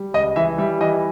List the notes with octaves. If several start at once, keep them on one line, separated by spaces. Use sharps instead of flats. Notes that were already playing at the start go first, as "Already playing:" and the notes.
Already playing: G3
C#2 D#5
E3 E5
G3 E5
E3 D#5